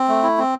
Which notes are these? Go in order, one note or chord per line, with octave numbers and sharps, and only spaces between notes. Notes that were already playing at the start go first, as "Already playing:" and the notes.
Already playing: C4
A3
E4
C4